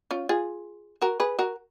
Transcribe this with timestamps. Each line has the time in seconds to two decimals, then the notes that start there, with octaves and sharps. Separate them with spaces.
0.11 C#4 F4
0.29 F4 G#4
1.02 F#4 A#4
1.20 G#4 B4
1.39 F#4 A#4